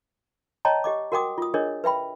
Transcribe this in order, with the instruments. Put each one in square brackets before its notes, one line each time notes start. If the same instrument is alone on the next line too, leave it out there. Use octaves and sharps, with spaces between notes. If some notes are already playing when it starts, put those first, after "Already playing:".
[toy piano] C#5 D#5 G5 A5 A#5
G4 D#5 D6
F#4 A#4 F#5 G5 D6 D#6
F4 D#6
D4 G#4 A#4 C#5 D#5
B4 E5 G5 B5